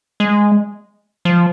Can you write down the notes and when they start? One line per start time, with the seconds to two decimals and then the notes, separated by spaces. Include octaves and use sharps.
0.20 G#3
1.25 F3